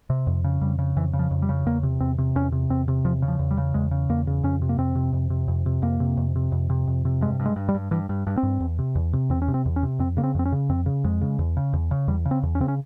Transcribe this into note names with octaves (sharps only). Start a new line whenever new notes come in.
C3
F2
C#3
F2 G3
C#3
F2 E3
C#3
F3
F2
G3
C#3
E2 A#3
C3
E2 C4
C3
E2 C#4
C3
E2 C4
C3
E2 F3
C#3
F3
E2
G3
C#3
E2 G#3
C#3
E2 A#3
C#3
F2 C#4
C3
A#3
F2 C4
C3
F2
C3
F2
C3
F2 A#3
C3
F2
C3
F2
C3
F2
C3
G2 G#3
G2
G#3
G2
G3
G2
G2 E3
G2
G2
C4
G2
E2
C3
E2
C3
E2 C4
C#4
C3
C4
E2
C#4
C3
F2 C4
C#3 A#3
C4
F2 C4
C#4
C#3
F2 C4
C#3
F2 G#3
C#3
E2
C#3
E2
C#3
E2 G3
C#3
C4
E2
C#4
C#3 C4
C#4